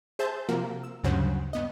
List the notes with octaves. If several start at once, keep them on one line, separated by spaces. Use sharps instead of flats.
G#4 C5 E5 A5 G6
C3 F3 A#3 F#4 A#4
E6
D2 G2 C#3 F#3 C5 F#5
G2 B3 D#5